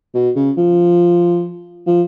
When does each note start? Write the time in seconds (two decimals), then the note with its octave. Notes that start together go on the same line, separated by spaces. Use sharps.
0.14 B2
0.36 C#3
0.57 F3
1.87 F3